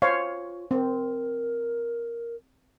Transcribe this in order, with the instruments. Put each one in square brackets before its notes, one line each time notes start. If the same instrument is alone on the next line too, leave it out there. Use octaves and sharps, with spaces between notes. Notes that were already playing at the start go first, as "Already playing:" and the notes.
[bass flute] F4 [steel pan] C5 C#5 F5
[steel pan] C4 [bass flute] A#4